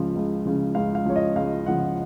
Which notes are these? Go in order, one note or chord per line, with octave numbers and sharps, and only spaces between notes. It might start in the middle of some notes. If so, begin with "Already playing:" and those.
Already playing: C#2 C#3 F3
C#2
C#3 F3
C#2 F5
F5
C#3 F3 C#5
D#5
C#2 F5
C#3 F3 F#5